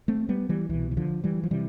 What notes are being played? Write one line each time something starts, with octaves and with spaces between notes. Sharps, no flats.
A3 C4
G3 B3
E3 G3
C2 B2 E3
E3
D3 F3
E3 G3
F3
C3 E3 G3